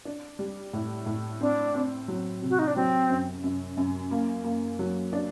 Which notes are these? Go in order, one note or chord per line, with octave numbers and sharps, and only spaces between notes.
D4
G3
A2
A2
C4 D4
C4
F#3
C3
F#4
D#4
D4
F#3 C4
F#2
F#2
F#2
A#3
A#3
F#3
D4